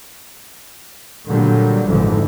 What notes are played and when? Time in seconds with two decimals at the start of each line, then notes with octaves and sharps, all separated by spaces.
1.26 A#2 D3 F#3 G3
1.87 G#1 F2 D3 E3